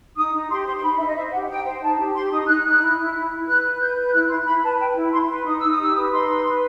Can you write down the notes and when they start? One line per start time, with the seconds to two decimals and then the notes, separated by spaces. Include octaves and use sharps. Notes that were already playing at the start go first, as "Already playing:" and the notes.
0.17 D#4 D#6
0.33 D#4
0.49 G4 C6
0.67 C5 C6
0.78 C6
0.83 D#4 B5
0.99 D#4 E5
1.08 D#5
1.15 C5 E5
1.32 G4 F#5
1.48 D#4 G5
1.65 C5
1.81 D#4 A5
1.98 G4
2.15 G4 C6
2.31 D#4 D#6
2.47 D#4 F#6
2.64 D#4 F#6
2.81 E4
2.98 E4
3.14 E4
3.31 E4
3.47 B4 F#6
3.63 B4
3.80 B4 G6
3.96 B4
4.07 G6
4.13 E4 F#6
4.29 E4 C6
4.46 E4 B5
4.63 B4 A5
4.78 B4 G5
4.96 E4
5.12 E4 C6
5.29 B4 C6
5.45 D#4 D#6
5.57 D#4 E6
5.69 D#6
5.78 G4 E6
5.93 B4 D#6
6.06 D#6
6.11 D#4 C6
6.28 B4
6.44 B4